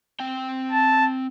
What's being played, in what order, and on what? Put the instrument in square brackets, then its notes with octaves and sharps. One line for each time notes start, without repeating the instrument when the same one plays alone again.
[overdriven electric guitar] C4 G5
[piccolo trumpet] A5